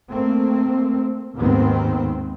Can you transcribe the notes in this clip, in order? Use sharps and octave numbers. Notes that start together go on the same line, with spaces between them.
A3 A#3 C4
D#2 G#2 D#3 B3 C4